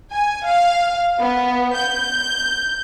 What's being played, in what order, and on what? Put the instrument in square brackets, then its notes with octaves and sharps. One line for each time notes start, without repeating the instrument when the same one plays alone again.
[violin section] G#5
F5
B3
G6